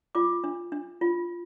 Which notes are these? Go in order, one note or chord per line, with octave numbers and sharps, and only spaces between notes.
F4 D6
D4
D4
F4